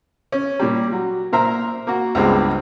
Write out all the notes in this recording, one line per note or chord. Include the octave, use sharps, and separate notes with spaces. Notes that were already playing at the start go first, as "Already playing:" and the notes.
C#4
A#2 G3
F#3
A#2 A#4 C5 E5 A#5
A#3 F#4
C#2 G2 G3 G#3 B3 C4